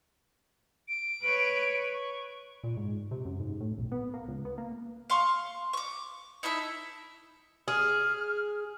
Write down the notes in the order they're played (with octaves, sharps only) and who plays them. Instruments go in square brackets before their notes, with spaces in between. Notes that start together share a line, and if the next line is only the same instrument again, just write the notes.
[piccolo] D7
[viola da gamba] B4 C#5
[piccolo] C#6
[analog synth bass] A#2
G#2
C3
F#2
G#2
A2
B1
B3
A#3
C#2
B3
A#3
[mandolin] F5 C6 C#6
C#6 D6
D#4 E4 A4 E5
[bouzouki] G#4 [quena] F6